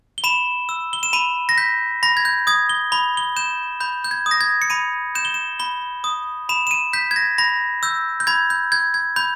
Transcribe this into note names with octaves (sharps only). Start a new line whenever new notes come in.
G7
B5 E7
E6
G7
E7
B5 D#7
A#6
G6 B6
B5 A#6
G#6
G6
D#6 G#6
G7
B5 G7
G7
G6 E7
B5 G6
G6
G#6
D#6
A#6
G#6
C#7
B5 D#7
G6 E7
G7
E7
B5 G7
D#6
B5 E7
E7
D#7
G6 B6
G#6
A#6
B5 A#6
E6 G6
G6
B5 G#6
G6
G6 G#6
G#6
B5 G6